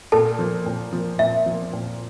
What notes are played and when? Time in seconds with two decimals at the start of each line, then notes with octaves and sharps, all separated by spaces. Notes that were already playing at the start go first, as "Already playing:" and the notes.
0.12 A#2 A4 A5
0.39 F3 A#3
0.66 A#2
0.93 F3 A#3
1.19 A#2 E5
1.46 F3 A#3
1.73 A#2